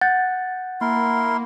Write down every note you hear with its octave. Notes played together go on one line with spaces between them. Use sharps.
F#5 G6 A6
A#3 E4 A#4 C6